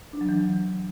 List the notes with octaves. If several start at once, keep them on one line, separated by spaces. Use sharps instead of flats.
D4
F#3
E3